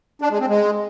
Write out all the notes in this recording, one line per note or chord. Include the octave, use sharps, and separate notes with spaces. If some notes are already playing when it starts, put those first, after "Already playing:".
D4
G#3
C4
G#3